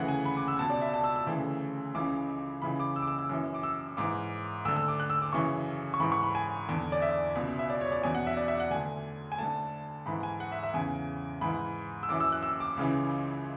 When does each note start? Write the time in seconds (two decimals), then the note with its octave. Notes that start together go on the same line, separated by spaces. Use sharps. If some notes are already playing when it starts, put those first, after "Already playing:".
Already playing: D2 C#3 E3 F#5
0.08 G#5
0.25 B5
0.37 D6
0.48 E6
0.59 C#2 B2 A5
0.70 D5
0.82 E5
0.94 A5
1.04 E6
1.16 E6
1.27 D2 C#3 E3
1.95 C#2 C#3 E3 D6
2.62 C#2 C#3 E3 B5
2.80 D6
2.96 E6
3.02 D6
3.07 E6
3.19 E6
3.29 F#2 E3
3.54 D6
3.63 E6
3.97 G#2 E3 D6
4.65 D2 E6
4.68 D3
4.76 E6
4.88 D6
5.00 F#6
5.10 E6
5.22 D6
5.33 F#2 C#3 E3 C#6
5.94 C#6
6.00 G#2 E3 B5
6.12 C#6
6.23 B5
6.35 G#5
6.69 E2 D3
6.92 D5
7.02 E5
7.35 C#2 B2
7.59 E5
7.70 D5
7.81 C#5
7.92 D5
8.03 E2 B2 G#5
8.15 F#5
8.27 E5
8.37 D5
8.48 E5
8.60 F#5
8.71 D2 D3 G#5
9.32 G#5
9.38 D2 D3 A5
10.06 G#2 E3 B5
10.23 G#5
10.40 F#5
10.52 E5
10.63 E5
10.73 E2 C#3 E3 G#5
11.41 G#2 E3 B5
12.03 E6
12.09 F#2 E3 D6
12.20 E6
12.32 F#6
12.43 E6
12.60 D6
12.77 C#2 C#3 E3